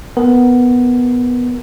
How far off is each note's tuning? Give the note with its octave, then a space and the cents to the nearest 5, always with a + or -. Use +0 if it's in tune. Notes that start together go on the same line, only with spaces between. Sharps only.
B3 +0 A#4 +0